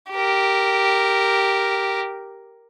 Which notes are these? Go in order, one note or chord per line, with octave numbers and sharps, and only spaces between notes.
G4 A#4